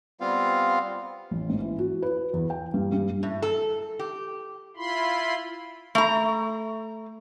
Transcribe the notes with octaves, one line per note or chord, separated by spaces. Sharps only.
G3 B3 C4 F4 F5
A1
G#2
E3
F#4
B4
E2
G5
G2
G2
A2
A4
G4
E4 F4 B5 C6
A3 A#5